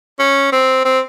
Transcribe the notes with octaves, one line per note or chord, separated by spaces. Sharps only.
C#4
C4
C4